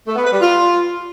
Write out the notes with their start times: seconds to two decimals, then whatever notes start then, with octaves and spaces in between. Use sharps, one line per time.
0.07 A3
0.16 B3
0.24 B4
0.33 G3
0.41 F4